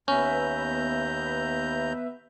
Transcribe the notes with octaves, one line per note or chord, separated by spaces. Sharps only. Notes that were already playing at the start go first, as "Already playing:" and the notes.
D#2 B3 C#4 B4 E5 A#5 G6